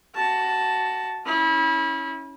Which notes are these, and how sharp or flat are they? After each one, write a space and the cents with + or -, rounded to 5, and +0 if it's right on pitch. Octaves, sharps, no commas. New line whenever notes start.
F#4 +15 A5 +0
C#4 +0 E4 -30